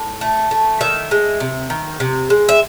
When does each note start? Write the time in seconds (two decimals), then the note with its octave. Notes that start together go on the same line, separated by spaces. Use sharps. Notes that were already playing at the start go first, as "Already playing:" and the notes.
Already playing: A2
0.21 A3
0.51 A3
0.81 D#3 E5
1.11 G#3
1.40 C3
1.70 D#3
2.00 C3
2.30 G#3
2.49 E5